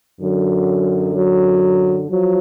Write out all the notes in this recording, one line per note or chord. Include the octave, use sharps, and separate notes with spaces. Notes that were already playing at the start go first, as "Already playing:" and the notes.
F#2 D3 F#3
F#3
F3 F#3